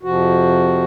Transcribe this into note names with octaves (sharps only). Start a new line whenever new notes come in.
F2 C3 F3 F#4